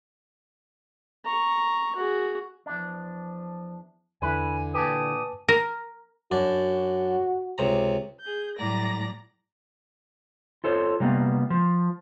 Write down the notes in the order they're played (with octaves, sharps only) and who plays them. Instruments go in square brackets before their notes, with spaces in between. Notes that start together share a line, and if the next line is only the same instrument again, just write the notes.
[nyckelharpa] A#5 C#6
F#4 G#4
[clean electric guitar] E2 D4 [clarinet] F3
[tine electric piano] E2 [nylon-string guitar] D3 E3 E4 [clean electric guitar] B4 [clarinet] G#5
[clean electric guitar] A#2 G4 [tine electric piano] B4 G#5 A5 [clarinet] D#6
[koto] A#4
[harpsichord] F#2 D4 [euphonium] F#4
[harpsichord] C#2 C3 A#5
[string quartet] G#4 G6
A2 F#3 G3 D5 A#5 A#6
[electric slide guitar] F4 A4 C5 C#5
C3 G3 A#3 B3
F3